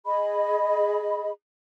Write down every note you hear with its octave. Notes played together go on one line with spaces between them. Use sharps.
G#4 D#5 B5